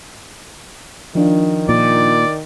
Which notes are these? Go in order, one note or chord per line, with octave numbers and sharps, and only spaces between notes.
D#3 F3 D4 F4
A#2 D5